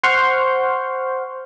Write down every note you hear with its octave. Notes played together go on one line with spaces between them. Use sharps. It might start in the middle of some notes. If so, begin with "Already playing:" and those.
C5 F#5 C6 C#6 F6 G6